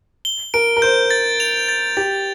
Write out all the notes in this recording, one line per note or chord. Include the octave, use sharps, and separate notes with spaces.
G7
A#4 D7
A#4
C5 G6
A6
F7
A6
G4 A6